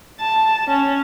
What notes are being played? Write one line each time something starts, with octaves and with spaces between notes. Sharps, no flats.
A5
C#4